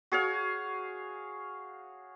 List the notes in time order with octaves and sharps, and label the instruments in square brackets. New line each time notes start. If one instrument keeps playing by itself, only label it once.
[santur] F#4 G#4 C#5 F5